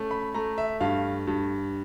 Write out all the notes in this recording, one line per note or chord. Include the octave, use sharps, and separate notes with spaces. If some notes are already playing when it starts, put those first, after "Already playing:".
Already playing: A3 C#4
B5
A3 A#5
E5
G2 F5
G2